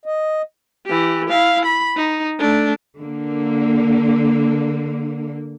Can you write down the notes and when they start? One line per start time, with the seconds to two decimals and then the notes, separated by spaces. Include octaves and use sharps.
0.06 D#5
0.86 E3 G4
1.29 E4 F5
1.65 B5
1.96 D#4
2.39 A3 D4
2.98 D3 A#3